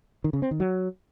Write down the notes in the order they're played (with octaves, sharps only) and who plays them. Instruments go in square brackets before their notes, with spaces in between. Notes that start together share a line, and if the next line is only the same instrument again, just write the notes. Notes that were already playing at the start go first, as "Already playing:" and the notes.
[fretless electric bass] D#3
C#3
C4
D#3
F#3